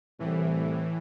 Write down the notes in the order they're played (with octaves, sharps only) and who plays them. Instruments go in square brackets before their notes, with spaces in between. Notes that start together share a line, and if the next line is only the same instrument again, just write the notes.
[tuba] C2 [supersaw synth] A2 E3